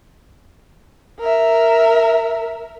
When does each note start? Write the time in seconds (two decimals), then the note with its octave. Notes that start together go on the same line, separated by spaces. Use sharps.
1.20 A#4 E5